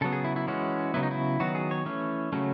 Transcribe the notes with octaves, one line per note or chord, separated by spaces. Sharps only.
C#3 F#3 B3 A4
G#4
E4
E4
E3 G#3 C#4 F#4
C#3 F#3 B3 E4
D#4
E4
D#3 F#3 B3 F#4
G#4
C#5
E3 A3 C#4
C#3 F#3 A3 C#4